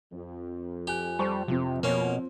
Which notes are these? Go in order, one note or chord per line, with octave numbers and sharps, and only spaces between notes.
F2
G4 G#5 F#6
G3 C5 A5 C#6
C3 F3 C4
B2 A#3 C#4